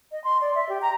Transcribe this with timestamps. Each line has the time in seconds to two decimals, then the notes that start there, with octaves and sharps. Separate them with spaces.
0.12 D#5
0.24 C6
0.41 D5
0.55 E5
0.69 G4
0.82 A#5